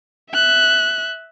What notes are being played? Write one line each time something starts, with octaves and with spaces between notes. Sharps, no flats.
E5 F#6